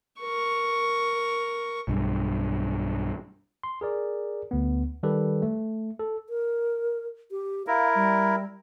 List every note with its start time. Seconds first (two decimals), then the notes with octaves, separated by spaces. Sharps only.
0.21 A#4 C#6
1.88 B1 G2
3.63 C6
3.81 G#4 A#4 D5
4.51 D2 B3
5.03 D#3 G3 G4 A4 B4
5.42 A3
5.99 A4
6.29 A#4
7.31 G4
7.67 E4 A#4 F5
7.95 G3